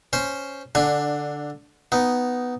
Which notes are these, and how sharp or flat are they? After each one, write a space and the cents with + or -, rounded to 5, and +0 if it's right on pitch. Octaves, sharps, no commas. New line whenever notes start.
C#4 +0 C5 +0
D3 +0 D4 +15 G#5 +5
B3 +5 D#4 +0